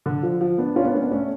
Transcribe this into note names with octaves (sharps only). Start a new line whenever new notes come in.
D3
F3
F3
B3 D4
C#4 F4
B3 D4
A3 C#4
B3 D4
A3 C#4